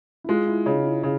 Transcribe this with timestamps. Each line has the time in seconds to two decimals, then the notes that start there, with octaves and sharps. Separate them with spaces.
0.24 E4
0.29 G#3 F4
0.47 E4
0.66 C#3 D#4
0.85 E4
1.03 C#3